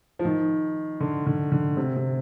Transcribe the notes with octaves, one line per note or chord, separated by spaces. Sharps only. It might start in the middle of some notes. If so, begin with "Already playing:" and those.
F3
D#3
D3
D3
D3
C3
C3